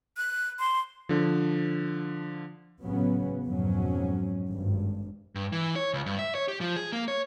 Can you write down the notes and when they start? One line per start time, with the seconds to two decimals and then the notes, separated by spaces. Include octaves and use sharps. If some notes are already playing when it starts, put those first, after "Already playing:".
0.17 F#6
0.59 C6
1.09 D3 F3
2.81 A1 C#3 F#3 B3 C#4
3.46 F2 G#2 B2 F#3 C#4
4.50 G#1 G2
5.35 G2
5.52 E3
5.76 C#5
5.93 C#2
6.06 G2
6.19 E5
6.35 C#5
6.48 G4
6.61 F3
6.76 G#4
6.92 A#3
7.08 C#5